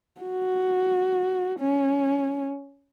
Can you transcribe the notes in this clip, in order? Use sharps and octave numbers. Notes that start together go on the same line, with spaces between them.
F#4
C#4